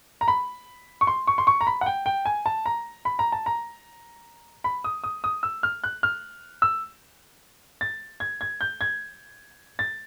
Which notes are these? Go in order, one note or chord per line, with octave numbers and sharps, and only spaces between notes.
A#5
B5
C#6
C6
C#6
C6
C#6
A#5
B5
F#5
G5
G5
G#5
A5
A#5
B5
A#5
A5
A#5
B5
D#6
D#6
D#6
E6
F6
F#6
F6
E6
A6
G#6
G#6
G6
G#6
A6